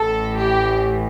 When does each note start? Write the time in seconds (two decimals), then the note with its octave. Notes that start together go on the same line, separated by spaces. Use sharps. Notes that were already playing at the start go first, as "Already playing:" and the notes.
Already playing: A1 A2 E3 A4
0.37 G4